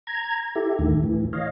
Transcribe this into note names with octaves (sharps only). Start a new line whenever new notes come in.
A#5 G#6
E4 G4 A4
D#2 A2 D3 D#3
A2 E3
C#5 D#5 F5